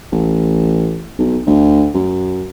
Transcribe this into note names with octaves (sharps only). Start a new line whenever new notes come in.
A1
B1
D2
F#2